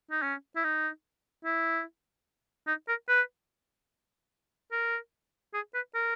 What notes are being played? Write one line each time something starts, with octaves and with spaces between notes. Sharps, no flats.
D#4
C#4
E4
D#4
E4
D#4
A#4
B4
A#4
G#4
B4
A#4